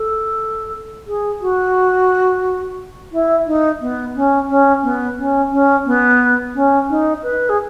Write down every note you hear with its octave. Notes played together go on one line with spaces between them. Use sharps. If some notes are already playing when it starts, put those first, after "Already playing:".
Already playing: A4
G#4
F#4
E4
D#4
B3
C#4
C#4
B3
C#4
C#4
B3
C#4
D#4
B4
G#4